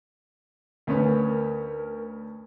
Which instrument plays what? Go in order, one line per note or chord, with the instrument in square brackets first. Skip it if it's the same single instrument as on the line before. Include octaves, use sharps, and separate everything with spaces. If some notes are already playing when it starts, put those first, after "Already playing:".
[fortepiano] D2 B3 C#4 [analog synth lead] A#4